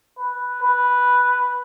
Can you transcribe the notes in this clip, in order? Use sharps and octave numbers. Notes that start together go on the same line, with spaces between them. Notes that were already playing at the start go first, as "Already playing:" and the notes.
B4
B4